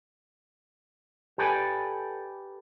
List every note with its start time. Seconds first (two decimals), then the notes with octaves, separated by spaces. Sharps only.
1.38 G4 A4 B4 D5 G#5